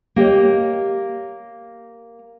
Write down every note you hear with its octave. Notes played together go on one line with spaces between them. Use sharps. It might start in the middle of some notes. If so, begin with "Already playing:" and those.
A#3 G4 C#5 D#5